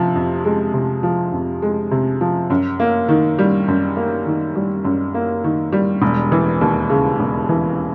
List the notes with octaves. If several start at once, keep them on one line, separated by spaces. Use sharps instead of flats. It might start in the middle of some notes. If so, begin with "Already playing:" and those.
Already playing: C3 F3
F2
G#3
C3
F3
F2
G#3
C3
F3
F#2
A#3
D#3
G3
F#2
A#3
D#3
G3
F#2
A#3
D#3
G3
E1
E3
D#2
C#3
E1
E3